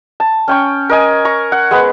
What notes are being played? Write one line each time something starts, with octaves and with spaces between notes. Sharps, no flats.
A5
C#4 G5 C#6
A#4 D#5 G#5
A#5 C#6
F#5
G#3 B3